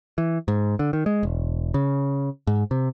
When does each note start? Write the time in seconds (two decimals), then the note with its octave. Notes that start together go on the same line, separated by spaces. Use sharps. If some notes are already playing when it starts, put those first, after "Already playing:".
0.18 E3
0.48 G#2
0.79 D3
0.93 D#3
1.06 G#3
1.23 E1
1.74 C#3
2.47 G#2
2.71 C3